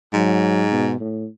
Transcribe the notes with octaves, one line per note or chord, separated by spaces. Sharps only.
G#2 F#3
B2
A2